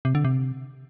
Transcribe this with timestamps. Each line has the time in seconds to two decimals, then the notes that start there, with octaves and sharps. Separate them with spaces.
0.05 C3
0.15 D3
0.25 C3